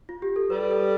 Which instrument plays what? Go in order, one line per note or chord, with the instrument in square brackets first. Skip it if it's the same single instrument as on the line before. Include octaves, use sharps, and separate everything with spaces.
[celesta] F4
G4
A4
[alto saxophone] G3 [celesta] B4
[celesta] A4